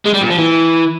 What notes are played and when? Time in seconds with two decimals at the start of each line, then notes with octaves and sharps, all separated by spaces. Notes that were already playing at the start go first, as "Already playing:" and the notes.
0.05 G#3
0.14 G3
0.22 A#2
0.30 F3
0.38 E3